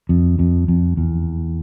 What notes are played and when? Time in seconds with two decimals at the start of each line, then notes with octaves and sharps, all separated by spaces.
0.09 F2
0.39 F2
0.68 F2
0.97 E2